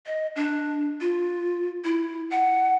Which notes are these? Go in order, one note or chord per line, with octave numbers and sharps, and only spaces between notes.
D#5
D4
F4
E4
F#5